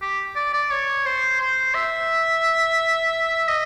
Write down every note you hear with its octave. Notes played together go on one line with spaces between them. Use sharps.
G4
D5
D5
C#5
C5
C5
E5
D#5